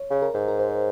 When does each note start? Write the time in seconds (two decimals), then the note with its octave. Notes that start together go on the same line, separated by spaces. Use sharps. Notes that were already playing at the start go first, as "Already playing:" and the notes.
Already playing: C#5
0.10 C#3
0.22 A#4
0.34 G#2
0.48 A#4
0.59 C5